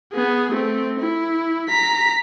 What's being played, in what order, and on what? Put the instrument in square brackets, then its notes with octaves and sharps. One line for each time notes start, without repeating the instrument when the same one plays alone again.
[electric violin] B3 G#4
A3 C4
E4
A#5 B6